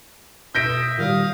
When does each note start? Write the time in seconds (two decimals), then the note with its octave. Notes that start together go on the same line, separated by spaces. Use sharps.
0.55 B2 E5 D#6 G6 A#6 D7
0.98 A#2 D#3 G3 F5 D#6